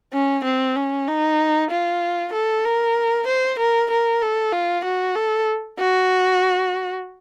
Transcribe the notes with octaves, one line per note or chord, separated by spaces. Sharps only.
C#4
C4
C#4
D#4
F4
A4
A#4
C5
A#4
A#4
A4
F4
F#4
A4
F#4